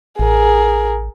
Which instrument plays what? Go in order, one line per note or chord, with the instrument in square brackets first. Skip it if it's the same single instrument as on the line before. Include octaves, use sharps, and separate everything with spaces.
[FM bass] A1 [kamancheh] G#4 A#4